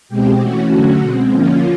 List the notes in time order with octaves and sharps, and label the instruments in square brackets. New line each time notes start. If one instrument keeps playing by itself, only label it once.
[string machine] B2 G#3 C4 G4
E3 A3 C#4 F#4
D3 F#3 A3 C#4
B2 G#3 C4
D3 F3 A#3 C#4 F4